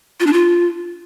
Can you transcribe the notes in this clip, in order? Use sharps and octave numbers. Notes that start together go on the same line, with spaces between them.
F4
D4
F4